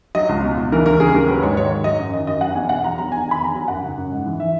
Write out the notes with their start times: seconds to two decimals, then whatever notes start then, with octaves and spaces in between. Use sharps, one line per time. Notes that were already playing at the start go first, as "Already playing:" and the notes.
0.15 F#3 D#5
0.29 C#2
0.44 B2
0.57 C#2
0.72 E3 A#4
0.86 D#2 A#4
0.99 C#3 G#4
1.14 D#2 A#4
1.28 F#3 B4
1.42 G#2 C#5
1.56 D#3 C#5
1.71 G#2
1.84 F#3 D#5
1.99 F#2
2.13 D#3 D#5
2.27 F#2 D#5
2.41 F#3 F#5
2.55 E2 G#5
2.69 B2 F#5
2.84 E2 A#5
2.98 F#3 A#5
3.11 E2 G#5
3.26 D#3
3.31 B5
3.41 E2 A#5
3.54 F#3 G#5
3.68 F#2 F#5
3.83 C#3
3.97 F#2
4.12 G#2
4.26 E3
4.40 E3 E5